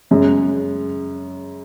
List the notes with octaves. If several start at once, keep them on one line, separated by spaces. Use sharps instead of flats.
F#2 C#3 G#3